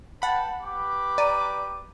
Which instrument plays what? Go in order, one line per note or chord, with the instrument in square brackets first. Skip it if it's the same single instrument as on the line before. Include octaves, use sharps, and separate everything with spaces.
[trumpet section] B4 G5 A5 [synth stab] F#5 B5
[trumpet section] G4 B4 D6
[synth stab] D5 A#5 D#7